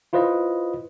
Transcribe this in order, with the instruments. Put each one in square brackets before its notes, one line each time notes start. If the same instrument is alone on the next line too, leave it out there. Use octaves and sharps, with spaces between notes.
[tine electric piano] E4 F4 B4 C5 D#5